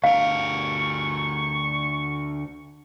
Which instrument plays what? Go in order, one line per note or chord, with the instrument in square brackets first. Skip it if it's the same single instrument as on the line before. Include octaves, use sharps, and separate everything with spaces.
[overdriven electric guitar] D2 A#4 [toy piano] F5 [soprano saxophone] C#6